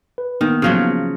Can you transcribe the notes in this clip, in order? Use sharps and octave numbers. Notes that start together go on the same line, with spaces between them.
B4
D#3 A#3 B3
C#3 F3 F#3